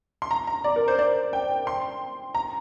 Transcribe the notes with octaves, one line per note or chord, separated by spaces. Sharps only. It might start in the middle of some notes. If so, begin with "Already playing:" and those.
C6
A#5
A#5
D5
A#4
C5
D5
G5
C6
A#5